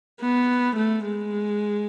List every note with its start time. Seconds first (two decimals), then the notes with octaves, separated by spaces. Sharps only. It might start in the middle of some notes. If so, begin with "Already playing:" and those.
0.21 B3
0.76 A3
1.05 G#3